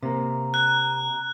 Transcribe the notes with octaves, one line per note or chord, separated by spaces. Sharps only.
C3 A#3 A#5
F#6